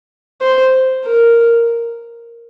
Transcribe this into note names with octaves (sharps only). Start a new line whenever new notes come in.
C5
A#4